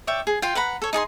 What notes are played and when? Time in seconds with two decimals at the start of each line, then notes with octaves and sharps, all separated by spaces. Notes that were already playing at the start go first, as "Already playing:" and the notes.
0.07 C#5 D5 E5 G5
0.27 G#4
0.42 F4 F5 G5
0.55 B4 F#5 A#5 B5
0.82 A4 C#5
0.93 D#4 G#4 D5 C6